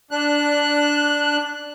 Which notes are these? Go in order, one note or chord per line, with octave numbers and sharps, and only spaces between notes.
D4 F#6